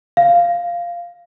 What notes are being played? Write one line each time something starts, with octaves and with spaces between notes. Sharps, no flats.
F5